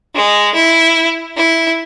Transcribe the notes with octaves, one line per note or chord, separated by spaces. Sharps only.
G#3
E4
E4